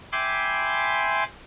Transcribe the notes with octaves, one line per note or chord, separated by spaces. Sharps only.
E5 G5 G#5 B5 C6 D6